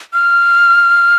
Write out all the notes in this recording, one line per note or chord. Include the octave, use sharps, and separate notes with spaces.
F6